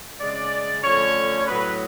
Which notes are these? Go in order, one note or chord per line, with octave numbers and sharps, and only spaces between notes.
C#3 G#3 C#4 D5
D3 F3 A3 C#4 C#5
A2 F#3 B3 B4